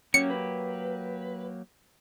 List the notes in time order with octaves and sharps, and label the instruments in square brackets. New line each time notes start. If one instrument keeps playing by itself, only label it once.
[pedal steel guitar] F#3 A#3 G4 [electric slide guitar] C#4 [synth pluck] C#7
[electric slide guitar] B4